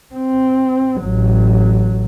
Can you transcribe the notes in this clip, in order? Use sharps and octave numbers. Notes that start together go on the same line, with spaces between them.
C4
A1 F#3